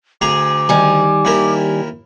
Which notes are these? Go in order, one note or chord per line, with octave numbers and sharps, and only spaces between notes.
D2 G#4 A#5 D6
D#3 G3 G#5
D#2 E4 A#4